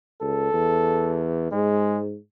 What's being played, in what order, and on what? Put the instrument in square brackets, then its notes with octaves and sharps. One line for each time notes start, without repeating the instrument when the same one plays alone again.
[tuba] C#2 [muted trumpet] A4
[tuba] E2
[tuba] G#2 [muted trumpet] G#3